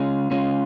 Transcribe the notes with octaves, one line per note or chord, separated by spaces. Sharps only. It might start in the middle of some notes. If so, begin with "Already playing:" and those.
Already playing: C#3 G#3 C#4 F4
C#3 G#3 C#4 F4